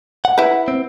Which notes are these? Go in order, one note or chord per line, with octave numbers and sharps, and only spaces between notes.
F#5
E4 B4
C4